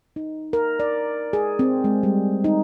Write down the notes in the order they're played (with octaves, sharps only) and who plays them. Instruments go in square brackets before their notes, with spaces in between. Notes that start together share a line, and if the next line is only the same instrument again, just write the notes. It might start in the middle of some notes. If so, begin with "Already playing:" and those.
[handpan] D#4
A#4
D5
G#4
C4
G#3
G3
D#4